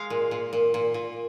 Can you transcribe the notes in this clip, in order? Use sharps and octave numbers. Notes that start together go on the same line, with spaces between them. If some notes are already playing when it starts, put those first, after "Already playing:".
Already playing: G#3 F5
A#2
A#2
A#2
A#2
A#2